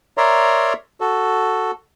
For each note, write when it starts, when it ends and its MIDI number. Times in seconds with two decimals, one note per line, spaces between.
0.18 0.73 70
0.18 0.73 73
0.18 0.73 74
0.18 0.73 76
0.18 0.73 82
0.18 0.73 84
1.01 1.71 66
1.01 1.71 69